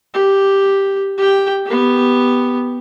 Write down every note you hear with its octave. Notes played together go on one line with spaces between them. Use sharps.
G4
G4 G5
B3 G4